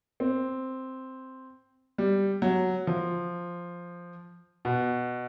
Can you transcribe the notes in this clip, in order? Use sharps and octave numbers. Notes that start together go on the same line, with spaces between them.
C4
G3
F#3
F3
B2